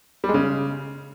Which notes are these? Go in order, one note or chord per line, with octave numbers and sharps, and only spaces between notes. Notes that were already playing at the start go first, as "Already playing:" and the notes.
G3
G#3
C#3